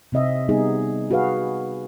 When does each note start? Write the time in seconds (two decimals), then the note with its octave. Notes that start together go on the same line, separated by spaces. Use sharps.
0.12 C3 C4 D#5 E5
0.49 G3 B3 D#4 G#4
1.11 F#4 G#4 B4 F5